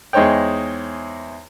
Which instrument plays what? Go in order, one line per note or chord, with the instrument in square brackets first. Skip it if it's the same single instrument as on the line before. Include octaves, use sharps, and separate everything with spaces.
[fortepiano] E2 G#3 D#4 C5 C#5 G5